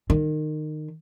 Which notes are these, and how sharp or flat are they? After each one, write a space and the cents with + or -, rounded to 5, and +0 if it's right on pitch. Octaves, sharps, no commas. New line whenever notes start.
D#3 -25